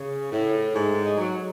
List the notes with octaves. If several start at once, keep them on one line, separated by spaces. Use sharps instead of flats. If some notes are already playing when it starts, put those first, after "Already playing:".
Already playing: C#3
A2
G#2
G#3
F#3